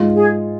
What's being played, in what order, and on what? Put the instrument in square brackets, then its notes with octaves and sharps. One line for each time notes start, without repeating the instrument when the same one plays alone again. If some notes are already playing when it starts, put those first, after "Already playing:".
Already playing: [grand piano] G#2 G#3 F4
[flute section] G#4